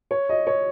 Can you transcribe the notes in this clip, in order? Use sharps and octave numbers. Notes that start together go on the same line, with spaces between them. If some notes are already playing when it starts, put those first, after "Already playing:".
C#5
D#5
C#5